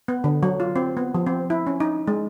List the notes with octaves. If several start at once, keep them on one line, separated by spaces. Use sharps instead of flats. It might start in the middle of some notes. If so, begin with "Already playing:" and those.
B3
D3
F#3
F4
C4
B3
F3
C4
E4
C#4
D#4
G#3